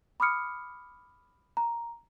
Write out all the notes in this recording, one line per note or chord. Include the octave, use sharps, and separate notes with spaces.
B5 D6 D#6 F6 C#7
A#5